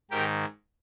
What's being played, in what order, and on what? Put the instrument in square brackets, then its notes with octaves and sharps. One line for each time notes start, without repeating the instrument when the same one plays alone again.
[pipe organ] G#2 D#3 G4 A#4